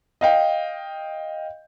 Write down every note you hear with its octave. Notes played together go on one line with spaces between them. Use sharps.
D#5 F5 G5